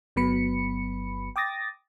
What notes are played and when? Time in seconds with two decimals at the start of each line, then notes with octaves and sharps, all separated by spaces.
0.16 G1 F#3 B3 B5 C#7
1.36 G5 D6 D#6 A6 A#6